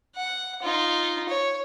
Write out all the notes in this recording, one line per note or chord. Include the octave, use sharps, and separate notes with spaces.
F#5
D#4 F4
C#5